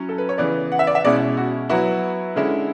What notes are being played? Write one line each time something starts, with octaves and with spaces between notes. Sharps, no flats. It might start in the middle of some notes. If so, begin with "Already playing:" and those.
Already playing: F#3 C#4 E4
A4
B4
C#5
C#3 E3 B3 D5
F#5
E5
D5
E5
B2 G#3 C#4 E4 D5
F#4
F#3 B3 E4 F#4
D3 G#3 C#4 E4